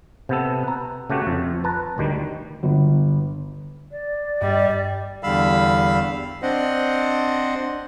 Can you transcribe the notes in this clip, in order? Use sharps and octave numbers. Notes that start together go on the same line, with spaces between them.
C3 B3 A4
B4 A#5
C#3 A3 F#4 G4
F2
B4 A5 A#5
D2 D#3 G3
G1
D5
G2 G3 D#5
E2 D3 G3 F5 B5 E6
C4 D4 C5 D#5 F#5